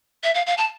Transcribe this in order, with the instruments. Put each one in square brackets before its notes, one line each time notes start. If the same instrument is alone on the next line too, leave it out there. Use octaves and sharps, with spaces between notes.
[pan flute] E5
F5
F5
A5